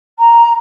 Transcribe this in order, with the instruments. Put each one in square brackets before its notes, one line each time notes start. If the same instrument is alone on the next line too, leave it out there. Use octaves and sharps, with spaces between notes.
[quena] A#5